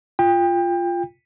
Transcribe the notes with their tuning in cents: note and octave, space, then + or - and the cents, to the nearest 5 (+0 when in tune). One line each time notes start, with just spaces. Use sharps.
F4 -5 G5 +25